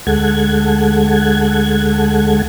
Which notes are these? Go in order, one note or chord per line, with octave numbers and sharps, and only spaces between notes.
D2 G#3 A4 F#5 G#6